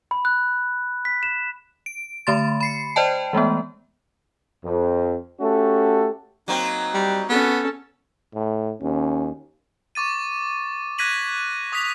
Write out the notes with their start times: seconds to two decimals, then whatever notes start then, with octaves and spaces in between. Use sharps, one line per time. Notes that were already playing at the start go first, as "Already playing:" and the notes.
0.11 B5
0.25 F#6
1.05 B6
1.23 E7
1.86 D7
2.27 D3 A3 B5 C6 A6
2.61 B5 C7 C#7
2.96 C5 D5 D#5 G5 A5
3.33 E3 G#3 A3 B3
4.64 F2
5.41 A3 C#4 F#4 G4 A4
6.48 F#3 A#3 C4 D#4
6.94 G3
7.29 B3 C#4 A4
8.34 A2
8.81 D#2 C#4
9.95 C#6 D6 A6 D#7
10.98 F#6 G#6 A#6 B6 D#7 F#7
11.72 C#6 D#6 G#6 A#6 B6 F7